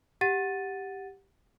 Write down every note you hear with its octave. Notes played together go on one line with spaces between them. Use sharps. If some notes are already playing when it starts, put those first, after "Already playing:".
G4 F#5 A6 D#7